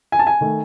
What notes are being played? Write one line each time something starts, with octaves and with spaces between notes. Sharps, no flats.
G#5
A5
G#5
D#3 A3